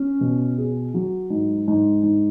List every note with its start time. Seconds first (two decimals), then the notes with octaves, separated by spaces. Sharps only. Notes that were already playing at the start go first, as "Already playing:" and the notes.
Already playing: C#4
0.21 B2
0.58 G#4
0.94 F#3
1.30 G#2
1.68 G#2
2.03 G#2